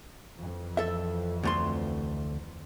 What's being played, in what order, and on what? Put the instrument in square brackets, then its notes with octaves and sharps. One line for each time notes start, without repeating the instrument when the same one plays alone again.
[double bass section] F2 E3
[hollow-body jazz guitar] A4 E5
D2 A3 C6